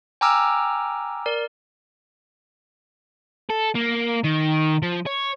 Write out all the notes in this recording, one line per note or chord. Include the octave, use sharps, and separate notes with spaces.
G5 G#5 A#5 D6 E6 F6
A#4 D5
A4
A#3
D#3
F3
C#5